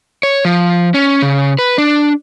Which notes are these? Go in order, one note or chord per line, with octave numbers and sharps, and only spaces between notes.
C#5
F3
C#4
C#3
B4
D4